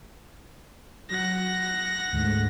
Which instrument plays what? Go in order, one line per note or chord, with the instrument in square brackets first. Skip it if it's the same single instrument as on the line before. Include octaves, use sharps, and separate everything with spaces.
[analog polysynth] F#3 [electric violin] F#5 A#6
[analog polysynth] D2 G#2 D3